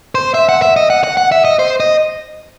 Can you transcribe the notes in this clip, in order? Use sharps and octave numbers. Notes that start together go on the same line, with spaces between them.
C5
E5
F#5
E5
D#5
F#5
F#5
F#5
E5
D#5
C5
D#5